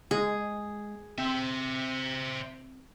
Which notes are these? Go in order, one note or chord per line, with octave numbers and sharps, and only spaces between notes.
G#3 G#4
C4 C5 E5